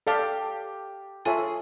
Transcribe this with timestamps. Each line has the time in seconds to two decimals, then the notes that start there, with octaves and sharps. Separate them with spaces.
0.07 G4 A4 D5 F5 A5
1.25 F4 G#4 A4 C#5 E5